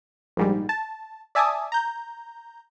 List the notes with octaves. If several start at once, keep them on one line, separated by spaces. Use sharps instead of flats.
A#1 G#2 G3
A5
D5 E5 G#5 A5 D6 D#6
A#5 G6